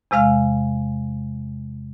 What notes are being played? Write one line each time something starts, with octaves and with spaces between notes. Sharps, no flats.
E2 C3 G#3 F5 F6